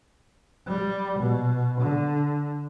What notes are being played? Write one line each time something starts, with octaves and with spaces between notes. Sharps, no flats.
G3
B2
D3